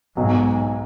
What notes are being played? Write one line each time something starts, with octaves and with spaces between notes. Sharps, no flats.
B1 G#2 B2 F#3